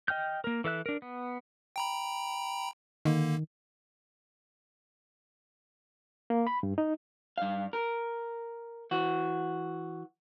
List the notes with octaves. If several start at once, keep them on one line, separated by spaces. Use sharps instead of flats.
D#5 G5 F6 G6
A#3 A#4
E3 A4 E5 F#6
D4 A#4
B3
G5 A#5 B5
D3 D#3 A#3
A#3
B5
G2
D#4
G2 F5
A#4
E3 F#4